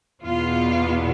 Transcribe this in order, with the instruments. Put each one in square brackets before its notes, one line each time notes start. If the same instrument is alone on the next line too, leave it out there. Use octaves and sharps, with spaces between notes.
[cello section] E2 B2 B3 F4